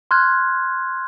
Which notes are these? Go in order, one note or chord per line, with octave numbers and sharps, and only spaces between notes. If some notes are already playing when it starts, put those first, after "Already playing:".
C6 F6 F#6 G#6